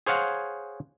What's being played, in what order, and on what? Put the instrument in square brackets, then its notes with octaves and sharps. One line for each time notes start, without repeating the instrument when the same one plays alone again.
[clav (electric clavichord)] G#4 C5 C#5 F5 F#5